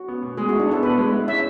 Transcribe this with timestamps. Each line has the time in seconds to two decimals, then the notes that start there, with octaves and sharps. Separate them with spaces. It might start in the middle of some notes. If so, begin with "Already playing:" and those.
Already playing: F#4
0.08 B3
0.22 B2
0.37 G#3 G#4
0.49 E4 F#4
0.60 D4
0.68 B3 A4
0.83 B2 B4
0.97 G#3
1.12 E4
1.28 C#4 E5